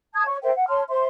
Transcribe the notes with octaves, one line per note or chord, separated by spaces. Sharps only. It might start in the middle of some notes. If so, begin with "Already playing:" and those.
A5 D#6 G#6
C#5 C#6
A#4 C5 E5 G5
F#5
C#5 A5 C6 F6
C5 E5 C6